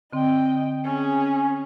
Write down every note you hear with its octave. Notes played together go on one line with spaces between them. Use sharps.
D3 C4 D#5 G5
C#4 G#4